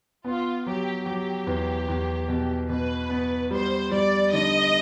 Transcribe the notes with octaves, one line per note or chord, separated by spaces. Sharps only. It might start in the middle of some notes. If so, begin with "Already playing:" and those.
B3 F4
F#3 G4
F#3 G4
E2
E2
B2
B2 B4
B3
G3 C5
G3 D5
D3 D#5